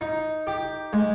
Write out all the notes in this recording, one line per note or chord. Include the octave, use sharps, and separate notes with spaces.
D#4
G4
G#3